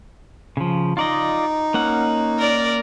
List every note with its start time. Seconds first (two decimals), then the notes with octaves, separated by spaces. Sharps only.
0.57 C#3 F3
0.97 D#4 F4 D5 D#5
1.74 A#3 C#4 F#5
2.39 A#4 D5